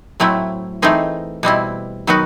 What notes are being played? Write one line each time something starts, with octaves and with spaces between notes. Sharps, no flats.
A2 F#3 A3 C4 E4
E3 A3 C4 D#4 G#4
B2 G3 C4 E4
D#3 F#3 B3 D#4 F#4